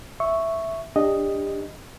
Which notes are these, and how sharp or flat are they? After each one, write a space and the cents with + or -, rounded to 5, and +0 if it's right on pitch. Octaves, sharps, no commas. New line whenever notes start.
E5 +0 C#6 +0
D4 +0 G4 +25 D#5 +0